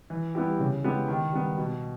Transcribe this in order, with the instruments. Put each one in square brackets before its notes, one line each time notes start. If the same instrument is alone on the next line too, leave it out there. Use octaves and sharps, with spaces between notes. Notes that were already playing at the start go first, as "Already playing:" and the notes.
[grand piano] E3
G3 B3 E4 G4
C#3
G#3 B3 E4 G4
D#3
G3 B3
B2